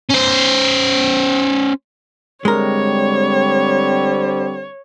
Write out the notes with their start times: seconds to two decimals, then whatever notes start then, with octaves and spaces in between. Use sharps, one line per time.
0.09 C#4 C5
2.45 D3 G3 G#3 C4 A#4 C#5